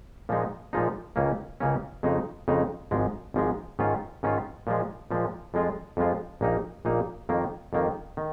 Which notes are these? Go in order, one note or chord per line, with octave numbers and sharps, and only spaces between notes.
A#2 F3 G#3 D#4
A#2 F3 G#3 D#4
C#2 C#3 A#3 C#4
C#2 C#3 A#3 C#4
F2 C#3 G#3 D#4
F2 C#3 G#3 D#4
G#1 G#2 F3 G#3
G#1 G#2 F3 G#3
G#2 D#3 C#4 F4
G#2 D#3 C#4 F4
A#2 F3 G#3
A#2 F3 G#3
F2 F3 G#3 F4
F2 F3 G#3 F4
A#1 A#2 A#3 D#4
A#1 A#2 A#3 D#4
F2 D#3 A#3
F2 D#3 A#3
D#3